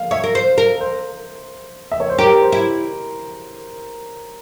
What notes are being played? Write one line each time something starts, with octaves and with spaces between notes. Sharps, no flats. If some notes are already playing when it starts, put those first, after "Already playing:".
Already playing: F5
C#5 E5
A#4
C5
A#4
C5
E5
C#5
C5
G4 A#4
C5
E4